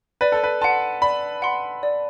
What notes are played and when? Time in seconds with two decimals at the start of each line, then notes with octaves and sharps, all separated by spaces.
0.21 B4 D5
0.32 A4
0.44 B4
0.62 F#5 A5 C6
1.02 D5 B5
1.42 F#5 C6
1.83 D5